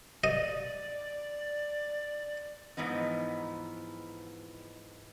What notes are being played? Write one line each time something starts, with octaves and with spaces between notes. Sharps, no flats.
D5 D#5
G#2 E3 F3 B3 D#4